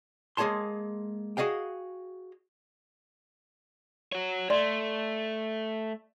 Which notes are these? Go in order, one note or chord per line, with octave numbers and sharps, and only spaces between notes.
G#3 A#3 G#4 C#5 A5 C6
F#4 G#4 D#5 F5 G5
F#4 C#5
A3 D5 C6